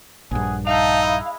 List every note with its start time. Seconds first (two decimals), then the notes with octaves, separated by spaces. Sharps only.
0.31 A#1 G2 G#4 F#5 G#5
0.67 D#4 E5 F5 G5 A5
1.03 G#3 E4